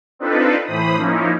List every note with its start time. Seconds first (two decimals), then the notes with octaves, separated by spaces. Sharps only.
0.19 C4 D4 D#4 F4 A4 B4
0.65 A2 E3 C5 B5 D#6
0.97 F3 A#3 C#4 D#4 E4